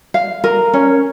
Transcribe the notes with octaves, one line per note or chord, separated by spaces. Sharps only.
F5
A#4
C#4